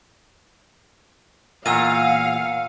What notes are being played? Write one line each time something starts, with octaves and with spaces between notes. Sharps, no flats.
E2 A#2 F5 F#5 E6 D#7